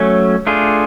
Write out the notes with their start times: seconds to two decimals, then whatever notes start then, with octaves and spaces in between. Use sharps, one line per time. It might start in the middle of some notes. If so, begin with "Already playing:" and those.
Already playing: F#3 A3 C#4
0.47 A3 D4 F4 G#4